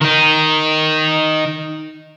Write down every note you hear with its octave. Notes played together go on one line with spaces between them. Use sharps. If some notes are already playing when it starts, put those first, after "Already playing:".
D#3 D#4